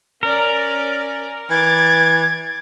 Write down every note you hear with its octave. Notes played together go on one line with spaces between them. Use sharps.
C#4 A#4 D5
E3 D6 G#6 A6